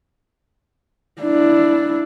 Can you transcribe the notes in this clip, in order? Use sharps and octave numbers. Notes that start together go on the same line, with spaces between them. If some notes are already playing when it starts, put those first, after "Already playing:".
D4 E4